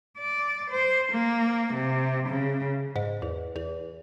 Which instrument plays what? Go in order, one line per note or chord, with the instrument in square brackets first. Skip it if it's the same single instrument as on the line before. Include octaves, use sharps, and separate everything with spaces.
[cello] D5
C5
A#3
C3
C#3
[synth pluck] G#2
E2
E2